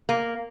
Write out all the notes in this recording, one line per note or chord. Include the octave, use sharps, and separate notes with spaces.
A#3